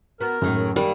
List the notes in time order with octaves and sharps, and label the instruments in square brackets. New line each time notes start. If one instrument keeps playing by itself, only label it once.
[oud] B3 F#4 [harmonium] A#4
[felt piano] F#2 [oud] A2 D#3 G#3
[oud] D#3 A#3 D4 [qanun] G3